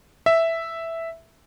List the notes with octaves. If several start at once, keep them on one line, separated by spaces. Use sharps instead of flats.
E5